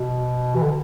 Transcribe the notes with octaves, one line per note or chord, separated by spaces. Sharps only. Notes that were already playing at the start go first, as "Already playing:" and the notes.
Already playing: B2
E3
D3